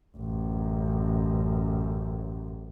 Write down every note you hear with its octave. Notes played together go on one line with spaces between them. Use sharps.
A1 F#2